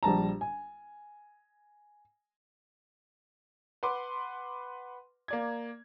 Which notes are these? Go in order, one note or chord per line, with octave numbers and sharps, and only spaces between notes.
A#1 G3 A5 A#5
G#5
B4 F#5 C6 D6
A#3 D5 G#6